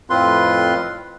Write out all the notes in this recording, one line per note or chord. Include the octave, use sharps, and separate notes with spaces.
F2 A2 C4 F4 B4 C6